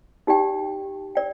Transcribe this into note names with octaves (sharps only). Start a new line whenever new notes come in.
D#4 G4 D5 G5
D5 G5